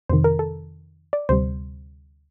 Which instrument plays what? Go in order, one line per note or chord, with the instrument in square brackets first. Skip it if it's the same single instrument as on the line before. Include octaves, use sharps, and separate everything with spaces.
[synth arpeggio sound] F2 C3 D#3 C5
A#4
A4
D5
D2 C3 G3 C5